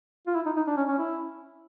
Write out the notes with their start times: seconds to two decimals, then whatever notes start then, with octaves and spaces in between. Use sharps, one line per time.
0.27 F4
0.35 E4
0.46 D#4
0.57 D#4
0.67 D4
0.77 C#4
0.88 C#4
0.98 E4